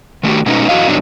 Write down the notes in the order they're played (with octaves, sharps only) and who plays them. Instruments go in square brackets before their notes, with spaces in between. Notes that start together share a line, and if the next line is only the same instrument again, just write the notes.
[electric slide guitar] D#3 A3 F#4 G4
B2 G#3 A3 B3 C#4 D#4
F#2 E3 F#4 D#5 F5
G2 B2 D3 F#3 D4 D#4